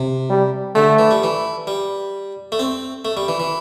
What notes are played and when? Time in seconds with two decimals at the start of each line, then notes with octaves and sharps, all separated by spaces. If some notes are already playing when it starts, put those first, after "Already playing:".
Already playing: C3
0.29 G3
0.75 D3 A3
0.99 E3
1.11 G3
1.23 E3
1.67 G3
2.52 A3
2.59 C4
3.05 A3
3.17 G3
3.28 E3
3.40 E3